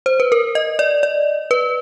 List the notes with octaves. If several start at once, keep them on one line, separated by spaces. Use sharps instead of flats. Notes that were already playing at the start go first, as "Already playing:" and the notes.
C5
B4
A#4
D#5
D5
D5
B4